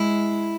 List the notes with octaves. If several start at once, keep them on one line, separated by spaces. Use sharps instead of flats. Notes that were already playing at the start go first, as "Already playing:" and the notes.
Already playing: G#3 E4